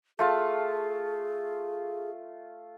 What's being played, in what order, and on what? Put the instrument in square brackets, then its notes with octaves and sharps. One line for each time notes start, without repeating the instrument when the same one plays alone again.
[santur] A3 F4 A5 [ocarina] G#4